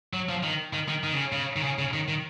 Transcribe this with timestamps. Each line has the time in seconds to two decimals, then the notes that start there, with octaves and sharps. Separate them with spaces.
0.14 F#3
0.29 F3
0.43 D#3
0.73 D#3
0.89 D#3
1.04 D#3
1.13 C#3
1.33 C#3
1.56 D#3
1.64 C#3
1.79 C#3
1.94 D#3
2.08 D#3